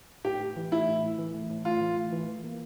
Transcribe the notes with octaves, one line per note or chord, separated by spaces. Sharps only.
A2 G4
A2
E3
A3 E4
A2
A2
E3
A3
A2
A2 F4
E3
A3
E3
E3
A#3